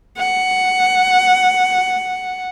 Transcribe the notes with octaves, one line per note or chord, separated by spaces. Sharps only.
F#5